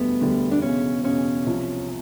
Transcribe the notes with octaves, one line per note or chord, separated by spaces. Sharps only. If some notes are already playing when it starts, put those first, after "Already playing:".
Already playing: E1 D2 D3 G3 B3
E1 D2 D3 G3
D4
E1 E2 C#3 C#4
E1 E2 C#3 C#4
C2 C3 F3